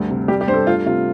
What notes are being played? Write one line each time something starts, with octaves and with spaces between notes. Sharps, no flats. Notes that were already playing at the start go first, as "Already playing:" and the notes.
Already playing: D2 G2
C3
G3 G4
G4
G2 C5
A4
A3 F4
C3 F4